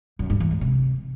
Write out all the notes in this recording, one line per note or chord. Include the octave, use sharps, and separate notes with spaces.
F#2
G2
E3
G#2
C3